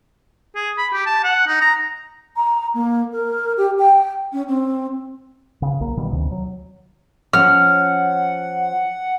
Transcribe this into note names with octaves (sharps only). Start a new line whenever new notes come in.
G#4
B5
G4
A5
F#5
D#4
A#5
A#5
A#3
A#4
G4
G5
C#4
C4
C#3
B1 A#3
B2 D#3 G3
D2 C3 D#3
F#3
F3 C#4 F#5 F6